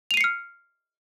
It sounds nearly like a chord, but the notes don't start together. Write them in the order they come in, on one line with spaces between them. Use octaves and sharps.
F7 D#7 C7 C#7 F6